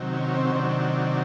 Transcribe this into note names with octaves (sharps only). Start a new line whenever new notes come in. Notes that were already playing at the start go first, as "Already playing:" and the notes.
Already playing: C3 D#3 F#3
C#4
C4
C#4
C3 D#3 F#3 D4